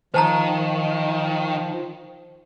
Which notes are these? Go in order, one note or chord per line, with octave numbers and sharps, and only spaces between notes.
D#3 F3 C5 A5 A#5